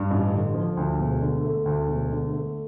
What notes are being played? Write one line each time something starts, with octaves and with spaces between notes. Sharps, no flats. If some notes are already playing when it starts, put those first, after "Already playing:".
Already playing: G2
A1
D3
F3
D2
E1
D3
A3
D2
E1
D3
A3